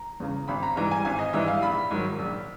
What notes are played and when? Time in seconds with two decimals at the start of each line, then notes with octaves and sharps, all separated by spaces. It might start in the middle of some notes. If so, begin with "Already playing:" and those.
Already playing: A#5
0.20 E2 C#3
0.48 G#1 B5
0.63 A#5
0.76 G#2 E3 G3 A#5
0.91 G#5
1.05 G#1 G#5
1.19 D#5
1.33 G#2 E3 G3 E5
1.48 F5
1.62 A#1 B5
1.91 G#2 D#3 F#3
2.19 A#1